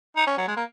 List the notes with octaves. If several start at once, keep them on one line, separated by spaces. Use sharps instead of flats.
D#4
C#4
F#3
G#3
A#3